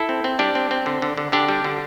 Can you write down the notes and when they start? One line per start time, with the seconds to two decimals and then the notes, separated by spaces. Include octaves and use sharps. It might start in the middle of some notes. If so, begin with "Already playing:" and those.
Already playing: E4 A4
0.09 C4
0.24 C4
0.39 G3 D4 G4
0.55 C4
0.71 C4
0.86 D3
1.02 D3
1.17 D3
1.32 D3 D4 G4
1.49 G3
1.64 D3